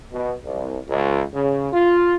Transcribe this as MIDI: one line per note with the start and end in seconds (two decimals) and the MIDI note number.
0.12 0.32 47
0.45 0.79 36
0.88 1.23 37
1.33 1.71 49
1.72 2.15 65